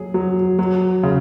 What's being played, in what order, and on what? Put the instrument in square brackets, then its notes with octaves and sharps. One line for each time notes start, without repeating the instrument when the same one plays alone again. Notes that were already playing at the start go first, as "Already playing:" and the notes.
Already playing: [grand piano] F#3 G#4
F#3
F#3
C#3